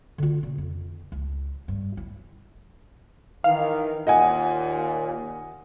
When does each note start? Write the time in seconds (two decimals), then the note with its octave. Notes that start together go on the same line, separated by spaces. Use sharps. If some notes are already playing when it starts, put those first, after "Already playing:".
0.18 D3 F4
0.43 A#2 C#3
0.58 F2
1.12 C#2
1.68 G2
1.97 E4
3.44 D#3 E3 F5
4.07 D#2 A#2 D#5 F#5 G#5